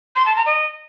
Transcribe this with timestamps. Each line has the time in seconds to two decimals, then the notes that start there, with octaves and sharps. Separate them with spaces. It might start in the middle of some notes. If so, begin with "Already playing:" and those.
0.16 C6
0.26 A5
0.36 A#5
0.46 D#5